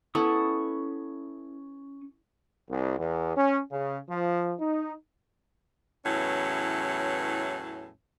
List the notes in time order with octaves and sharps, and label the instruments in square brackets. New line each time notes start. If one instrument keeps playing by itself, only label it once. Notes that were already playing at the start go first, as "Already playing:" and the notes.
[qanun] B3 E4 A4 [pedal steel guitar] C#4 C#6 D#6
[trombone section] C2
E2
C#4
C#3
F3
D#4
[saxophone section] E2 A2 E3 F#3 C#4